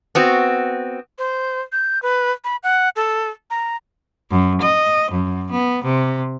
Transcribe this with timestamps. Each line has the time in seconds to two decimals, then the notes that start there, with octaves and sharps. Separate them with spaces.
0.15 B3 C4 F#4
1.18 C5
1.72 G6
2.03 B4
2.44 B5
2.63 F#5
2.96 A4
3.51 A#5
4.31 F#2
4.61 D#5
5.11 F#2
5.51 B3
5.84 C3